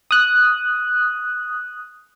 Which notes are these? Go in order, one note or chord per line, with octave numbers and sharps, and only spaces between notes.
D#6 F#6